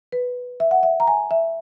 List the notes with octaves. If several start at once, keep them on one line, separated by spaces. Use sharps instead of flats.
B4
E5
F#5
E5
A#5
G#5
E5